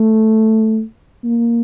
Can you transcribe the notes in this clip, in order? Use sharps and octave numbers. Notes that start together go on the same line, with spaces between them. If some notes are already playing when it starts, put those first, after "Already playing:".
Already playing: A3
A#3